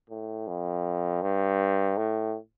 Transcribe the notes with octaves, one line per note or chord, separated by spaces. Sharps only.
A2
F2
G2
A2